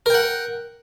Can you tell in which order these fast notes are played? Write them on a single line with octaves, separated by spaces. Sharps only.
A#4 G5 F#5